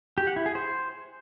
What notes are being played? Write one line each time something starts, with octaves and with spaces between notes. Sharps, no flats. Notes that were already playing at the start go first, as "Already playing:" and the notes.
G4
F#5
E4
G#4
C5